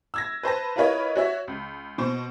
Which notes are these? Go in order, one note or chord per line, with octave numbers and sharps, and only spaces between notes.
E6 G#6 A#6
B4 C5 A5 A#6
E4 F4 A#4 B4 C#5 D#5
F#4 C#5 E5
C#2
B2 C5